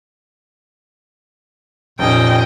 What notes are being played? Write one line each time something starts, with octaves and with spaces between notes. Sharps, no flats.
F1 A#2 C#4 D#5 G5